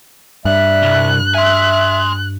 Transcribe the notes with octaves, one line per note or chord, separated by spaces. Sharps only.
G2 G3 D5 E5 F#6
C2
E5 G#5 C6